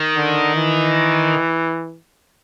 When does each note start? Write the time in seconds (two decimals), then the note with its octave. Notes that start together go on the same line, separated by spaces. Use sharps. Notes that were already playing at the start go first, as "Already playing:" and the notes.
Already playing: D#3
0.16 D3
0.55 E3